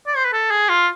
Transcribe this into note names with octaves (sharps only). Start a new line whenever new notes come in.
D5
C5
B4
A4
G#4
F4